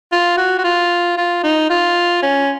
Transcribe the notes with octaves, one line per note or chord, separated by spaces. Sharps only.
F4
F#4
F#4
F4
F4
D#4
F4
C#4